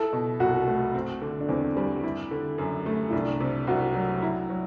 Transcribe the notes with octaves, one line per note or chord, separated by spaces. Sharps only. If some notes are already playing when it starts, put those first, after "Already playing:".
Already playing: E4 A4
B2
C2 F#4
A3
C4
D3
D4
E2 C4
G3
E4
D3
F#2
A3
E4
C2 D4
C3
C2 F#4
F#3
E4
F#3